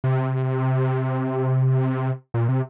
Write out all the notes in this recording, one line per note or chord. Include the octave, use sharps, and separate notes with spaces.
C3
A#2
C3